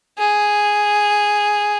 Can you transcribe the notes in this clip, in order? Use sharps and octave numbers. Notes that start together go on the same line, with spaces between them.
G#4